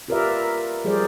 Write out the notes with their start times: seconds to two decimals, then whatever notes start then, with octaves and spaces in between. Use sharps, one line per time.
0.08 F4 G4 A#4 B4 D5 E5
0.85 F3 G3 G#4 A#4 C5 D5